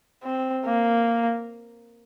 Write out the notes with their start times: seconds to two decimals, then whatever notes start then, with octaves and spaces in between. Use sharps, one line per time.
0.23 C4
0.66 A#3